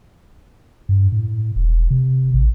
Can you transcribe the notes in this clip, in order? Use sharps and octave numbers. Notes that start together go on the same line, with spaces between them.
G2
A2
E1
C3
A1